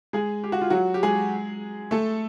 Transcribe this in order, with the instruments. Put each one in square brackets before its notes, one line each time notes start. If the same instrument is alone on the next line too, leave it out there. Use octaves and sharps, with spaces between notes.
[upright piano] G#3 G#4
G4
F#4
F4
F#3 F#4
G4
G#3 G#4
A3 A4